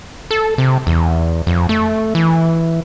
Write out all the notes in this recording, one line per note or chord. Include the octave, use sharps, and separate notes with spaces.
A4
C3
E2
F2
A3
E3